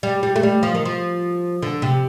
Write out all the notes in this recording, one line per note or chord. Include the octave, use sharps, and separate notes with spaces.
G3
G3
A3
G3
F3
D#3
F3
D3
C3